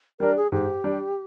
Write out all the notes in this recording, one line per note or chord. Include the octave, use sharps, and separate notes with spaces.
G3 D4 A#4
G#4
G#2 G4
G3 D4